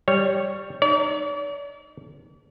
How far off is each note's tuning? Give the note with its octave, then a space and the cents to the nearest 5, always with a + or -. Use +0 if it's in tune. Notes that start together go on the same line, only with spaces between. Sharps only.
G3 +0 C#5 +0
D#4 -25 D5 -45